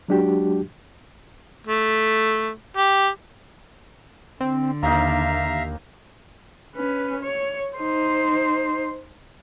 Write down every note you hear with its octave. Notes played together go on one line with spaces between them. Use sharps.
F#3 G#3 D4 F#4 G4
A3
G4
D3 C4
D#2 A#3 D#4 E5 F5 A#5
C#4 B4
C#5
D#4 C5